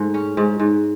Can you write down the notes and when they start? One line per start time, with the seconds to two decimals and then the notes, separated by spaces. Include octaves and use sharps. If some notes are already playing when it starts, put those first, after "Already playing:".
Already playing: G#2 A3
0.14 C#4
0.37 G#2
0.60 G#2